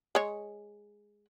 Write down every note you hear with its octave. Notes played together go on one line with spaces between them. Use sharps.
G#3 C#5